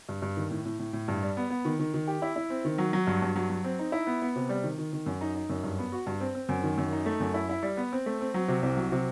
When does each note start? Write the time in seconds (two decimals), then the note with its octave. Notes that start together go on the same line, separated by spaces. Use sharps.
0.09 G2
0.22 G2
0.37 D#3
0.51 A2
0.65 A2
0.79 A2
0.93 A2
1.08 G2
1.23 G3
1.37 B3
1.50 B3
1.65 D#3
1.79 D#3
1.94 D#3
2.08 G4
2.22 E4
2.36 E4
2.50 C4
2.65 D#3
2.78 F#3
2.93 F#3
3.07 G2
3.22 G2
3.36 F#3
3.50 F#3
3.64 C4
3.79 D#4
3.92 E4
4.07 B3
4.22 B3
4.36 C3
4.49 G3
4.64 D#3
4.78 D#3
4.93 D#3
5.06 F#2
5.21 D#4
5.35 D#4
5.50 F#2
5.63 G2
5.79 B3
5.92 F#4
6.07 G2
6.20 C4
6.35 C4
6.49 F#2
6.63 D#3
6.78 F#2
6.93 D#4
7.06 A3
7.20 F#2
7.34 E4
7.49 E4
7.63 G3
7.77 B3
7.92 C4
8.06 A3
8.21 C4
8.34 F#3
8.48 C3
8.63 C2
8.77 F#3
8.92 C3